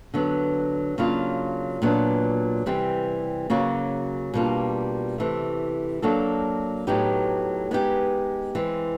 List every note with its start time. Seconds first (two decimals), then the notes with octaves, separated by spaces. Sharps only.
0.14 D3 F#3 B3
0.98 C#3 F#3 A#3 D4 F4
1.82 A#2 F#3 B3 D4
2.66 C3 E3 G3 C4
3.50 C#3 F#3 A#3 C#4 F#4
4.34 B2 G3 A#3 D4 F4
5.18 C3 E3 A3
6.02 F#3 A#3 D4 F#4 A4
6.87 A2 F#3 B3 D#4 G4
7.71 G#3 B3 D#4 G4
8.55 E3 G#3 C4